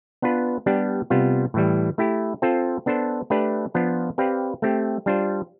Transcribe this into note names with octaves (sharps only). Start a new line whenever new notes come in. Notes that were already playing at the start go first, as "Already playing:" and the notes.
B3 D4 F4 B4
G3 B3 D4 G4
C3 G3 B3 F4
A2 E3 G3
A3 E4 G4
C4 F4 A4 C5
B3 D4 A4 C5
A3 D4 G4 B4 D5
F3 B3 D4 F4
C4 G4 B4 D5 F5
A3 C4 G4
G3 D4 F4 C5